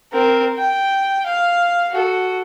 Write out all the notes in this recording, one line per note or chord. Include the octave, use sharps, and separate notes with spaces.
C4 A#4
G5
F5
F#4 A4